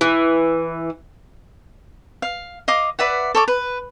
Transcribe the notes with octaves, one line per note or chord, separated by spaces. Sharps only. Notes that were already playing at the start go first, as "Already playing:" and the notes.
E3
F5
D#5 F5 D6
B4 D5 E5 F#5
A4 C#5 D6
B4